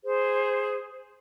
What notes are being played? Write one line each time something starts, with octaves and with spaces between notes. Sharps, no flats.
G#4 C5